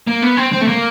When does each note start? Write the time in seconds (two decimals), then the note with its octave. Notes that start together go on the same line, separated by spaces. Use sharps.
0.07 A#3
0.22 B3
0.37 C4
0.52 C4
0.61 A3
0.68 A#3